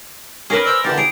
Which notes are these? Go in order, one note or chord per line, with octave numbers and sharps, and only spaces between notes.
C#4 G#4 A#4 B4
C5 D5 E6
E2 A#2 D3 G4 A6
G#4 A#5 D7